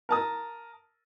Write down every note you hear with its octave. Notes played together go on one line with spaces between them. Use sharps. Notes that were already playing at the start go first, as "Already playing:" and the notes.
A#4 A5 D#6